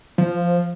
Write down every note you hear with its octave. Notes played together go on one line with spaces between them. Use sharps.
F3